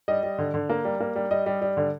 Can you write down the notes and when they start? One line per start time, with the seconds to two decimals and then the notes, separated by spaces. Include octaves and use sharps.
0.08 G3 D#5
0.23 G3
0.38 D3
0.54 D3
0.70 A#3
0.85 G3
1.00 A#3
1.16 G3
1.31 G3 D#5
1.46 G3
1.61 G3
1.77 D3